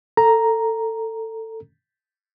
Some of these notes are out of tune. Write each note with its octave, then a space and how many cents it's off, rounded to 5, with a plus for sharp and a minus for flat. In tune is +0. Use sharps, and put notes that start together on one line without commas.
A4 +20 A#5 +0